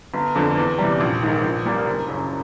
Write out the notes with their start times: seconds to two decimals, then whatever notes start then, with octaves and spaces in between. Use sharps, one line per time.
0.14 G1
0.35 F2 D3
0.57 E2
0.78 C3 E3 G3
1.00 A#1
1.22 G#2 D#3
1.44 A#1
1.65 A#2 G3 A#3
1.86 F#1
2.08 F#2 C#3